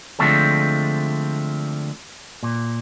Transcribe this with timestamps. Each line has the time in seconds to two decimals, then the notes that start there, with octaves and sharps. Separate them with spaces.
0.19 D3 F3 G#3 A3 C4 A4
2.43 A#2